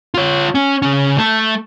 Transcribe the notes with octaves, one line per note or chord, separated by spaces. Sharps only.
F4 C#5
C#4
C#3 C#4
A3